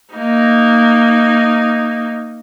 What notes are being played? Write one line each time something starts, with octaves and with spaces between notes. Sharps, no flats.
A#3 D#4